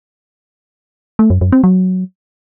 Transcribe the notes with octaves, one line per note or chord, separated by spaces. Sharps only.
A3
F#2
F#2
C4
F#3